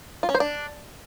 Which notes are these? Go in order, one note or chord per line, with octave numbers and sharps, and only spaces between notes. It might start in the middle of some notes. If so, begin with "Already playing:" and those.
F4
C#4
C5
D4